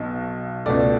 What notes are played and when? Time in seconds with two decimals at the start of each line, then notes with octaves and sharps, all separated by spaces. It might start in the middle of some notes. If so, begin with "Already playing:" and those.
Already playing: B1 B2
0.66 C#2 B2 A3 D5